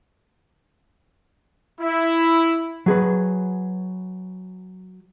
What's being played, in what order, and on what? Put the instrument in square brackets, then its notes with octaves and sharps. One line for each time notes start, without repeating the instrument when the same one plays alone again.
[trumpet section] E4
[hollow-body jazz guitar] F#3 G#4 B4